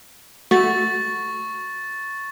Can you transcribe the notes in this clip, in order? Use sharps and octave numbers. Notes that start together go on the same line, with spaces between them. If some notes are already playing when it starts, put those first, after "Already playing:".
A3 F#4 C#6 A6